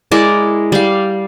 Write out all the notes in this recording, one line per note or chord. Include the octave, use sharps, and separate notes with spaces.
G#3 E4 A#4 D5
G3 F5